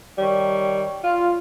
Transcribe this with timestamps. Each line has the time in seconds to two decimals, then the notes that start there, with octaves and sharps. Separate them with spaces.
0.19 D#3 G3 C#5
1.04 F4